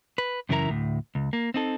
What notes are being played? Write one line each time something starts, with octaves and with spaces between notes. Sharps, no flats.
B4
F#2 C#3 E3 E4 A#4 A#5
D2 A2
C#2
A#3
C4 D#4 A4